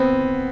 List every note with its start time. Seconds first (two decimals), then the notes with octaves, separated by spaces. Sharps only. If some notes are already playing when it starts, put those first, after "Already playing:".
Already playing: B3 C4